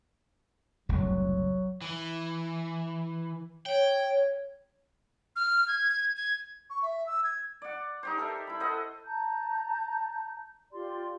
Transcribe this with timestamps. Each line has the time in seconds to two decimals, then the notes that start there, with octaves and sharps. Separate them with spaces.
0.89 F#1 C2 A2 F#3
1.81 E3
3.66 C#5 G5
5.36 F6
5.68 G#6
6.16 G#6
6.70 C#6
6.82 E5
7.06 E6
7.24 G#6
7.62 D5 F#5
8.03 D#4 G4 C5
8.18 A4 A#4 E5
8.47 E4 B5
8.60 A4 C5 D#5 F#5
9.05 A5 A#5 G6
10.72 F4 G4 D5 C6